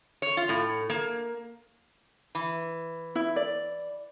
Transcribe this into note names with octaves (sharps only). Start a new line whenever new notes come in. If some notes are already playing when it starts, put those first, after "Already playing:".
C#5
F4
A2
A#3
E3
E4
D5